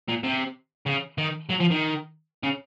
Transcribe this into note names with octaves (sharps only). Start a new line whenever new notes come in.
A#2
C3
C#3
D#3
F#3
F3
D#3
C#3